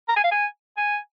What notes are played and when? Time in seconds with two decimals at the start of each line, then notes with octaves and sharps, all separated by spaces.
0.08 A#5
0.16 G#5
0.24 F5
0.32 G#5
0.77 G#5